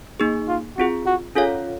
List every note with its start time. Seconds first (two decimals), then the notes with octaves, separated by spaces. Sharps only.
0.20 A#3 D#4 G#4
0.49 F4
0.78 C4 F4 F#4 G#4
1.06 F#4
1.36 C#4 F4 G#4 A4 C#5 F5